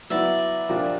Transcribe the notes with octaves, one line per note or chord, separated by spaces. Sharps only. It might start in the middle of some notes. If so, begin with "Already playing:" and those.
F#3 B3 E4 D5 E5
A#2 F3 A#3 D4 G4